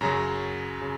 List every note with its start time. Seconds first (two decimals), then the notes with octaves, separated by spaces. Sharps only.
0.01 F#2 C#3 F#3 A#5
0.82 C#3